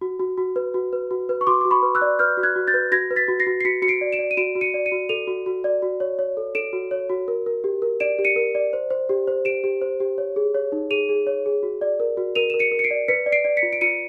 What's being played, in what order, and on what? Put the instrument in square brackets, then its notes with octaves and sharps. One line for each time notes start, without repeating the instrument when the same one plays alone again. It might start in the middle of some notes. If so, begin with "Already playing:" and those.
[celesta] F#4
F#4
F#4
B4
F#4
B4
F#4
B4
C#6
F#4 C6 D6
F#4 D6
B5 C#6
B4
E6 F#6
D5
B4 F6 G6
F#4
F#6 G#6
F#4
G6 A6
B4
F#4 G#6 A#6
B4
A6 B6
F#4
A#6 C7
F#4
C7
F#4 B6 C#7
F#4 C#7
C7 D7
D5
D7 E7
D5
D#7
F#4 D7 E7
F#4
C#7 D#7
D5
C#7 D#7
F#4
A4 D#7 F7
F#4
F#4
D5
F#4
C#5
C#5
A4
A4 D7 E7
F#4
C#5
F#4
A#4
A#4
G4
A#4
D5 D7 E7
G4
C#7 D#7
A#4
D5
C5
C5
G4
C5
G4 D7 E7
G4
C5
G4
C#5
G#4
C#5
D#4
G#4 D#7 F7
G#4
C#5
G#4
F#4
D5
A#4
F#4
A#4 D#7 F7
A#4 E7
C#7 D#7
A#4
C#7
C7 D7
D5
B4 B6 C#7
D5
C7 D7
D5
B6 C#7
F4
D7
F4 C#7 D#7